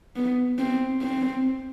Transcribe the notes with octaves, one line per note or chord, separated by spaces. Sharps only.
B3
C4
C4